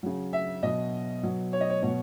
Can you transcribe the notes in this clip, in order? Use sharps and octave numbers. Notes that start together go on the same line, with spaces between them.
C#3 F#3
E5
B2 F#3 D#5
B2 F#3
C#5
D#5
C#5
B2 F#3 C#5